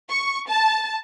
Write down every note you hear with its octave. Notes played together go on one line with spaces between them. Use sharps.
C#6
A5